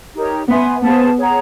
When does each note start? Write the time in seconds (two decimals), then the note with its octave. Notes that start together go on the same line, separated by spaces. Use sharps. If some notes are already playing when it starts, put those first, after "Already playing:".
0.15 D#4 G4 A#4 C#5
0.48 B3 B4 E5 G#5 C6
0.83 B3 G#4 C5 F5 A5
1.17 G#4 C#5 F#5 A#5